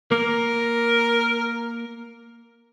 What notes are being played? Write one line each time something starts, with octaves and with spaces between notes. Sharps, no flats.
A#3 A#4